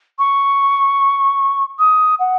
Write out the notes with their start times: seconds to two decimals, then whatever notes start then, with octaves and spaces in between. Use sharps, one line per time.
0.19 C#6
1.79 D#6
2.19 F#5